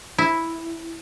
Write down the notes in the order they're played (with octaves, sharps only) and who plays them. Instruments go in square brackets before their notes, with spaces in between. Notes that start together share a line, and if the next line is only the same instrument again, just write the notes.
[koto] E4